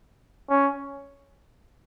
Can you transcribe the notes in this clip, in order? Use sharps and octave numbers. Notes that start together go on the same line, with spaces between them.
C#4